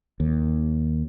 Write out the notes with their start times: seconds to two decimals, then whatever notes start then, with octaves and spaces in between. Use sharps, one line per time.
0.20 D#2